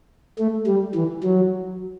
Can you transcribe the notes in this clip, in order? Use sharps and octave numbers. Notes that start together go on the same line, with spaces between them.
A3
G3
E3
F#3